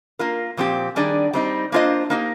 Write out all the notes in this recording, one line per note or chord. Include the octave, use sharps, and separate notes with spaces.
A#3 F4 A#4
A#2 F3 C4 G4
D#3 G3 D4 G#4 D5
G3 C4 D#4
A#3 D4 F4 C5 D#5
A#3 D#4 G4